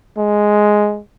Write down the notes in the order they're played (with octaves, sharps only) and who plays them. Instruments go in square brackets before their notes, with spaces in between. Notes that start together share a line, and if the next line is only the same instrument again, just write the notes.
[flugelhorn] G#3